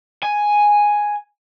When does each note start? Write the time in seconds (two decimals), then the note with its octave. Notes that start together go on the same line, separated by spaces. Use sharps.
0.23 G#5